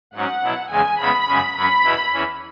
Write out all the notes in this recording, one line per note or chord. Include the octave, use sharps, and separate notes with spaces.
G#2 F#3 C#4 F#5
B2 F#3 E4
E2 C#3 G#3 G#5
E2 C#3 G#3 B3 B5
F#2 C#3 G#3 C#4
F#2 F#3 C#4 B5
E2 B2 B3 E4
E2 E3 C#4